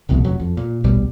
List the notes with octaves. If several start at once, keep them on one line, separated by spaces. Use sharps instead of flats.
F1 C2 F2 B2
F1 F#3
F2
A#2
D1 A#1 B2 G3